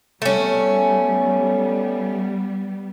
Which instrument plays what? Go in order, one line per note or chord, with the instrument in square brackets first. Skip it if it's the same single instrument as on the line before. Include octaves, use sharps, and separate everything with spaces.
[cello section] G3 B3 [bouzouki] A3 C#4